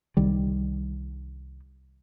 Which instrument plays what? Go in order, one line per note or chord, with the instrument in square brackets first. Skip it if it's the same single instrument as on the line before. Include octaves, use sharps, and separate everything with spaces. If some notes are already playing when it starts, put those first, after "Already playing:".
[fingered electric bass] C2 D#3 G3